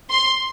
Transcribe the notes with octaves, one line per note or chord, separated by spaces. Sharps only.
C6